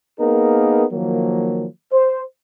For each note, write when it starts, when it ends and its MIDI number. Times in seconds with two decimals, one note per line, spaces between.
0.19 0.84 58
0.19 0.84 59
0.19 0.84 63
0.19 0.84 68
0.19 0.84 70
0.93 1.65 51
0.93 1.65 53
0.93 1.65 54
0.93 1.65 58
1.92 2.23 72